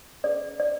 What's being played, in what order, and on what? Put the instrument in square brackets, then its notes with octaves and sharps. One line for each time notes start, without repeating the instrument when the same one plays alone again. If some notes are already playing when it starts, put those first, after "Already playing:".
[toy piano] C#4 G#4 B4 D5
D5